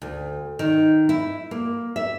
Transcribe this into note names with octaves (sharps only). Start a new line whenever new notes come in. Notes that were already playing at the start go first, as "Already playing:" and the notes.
D2
D#3
E4
A#3
E5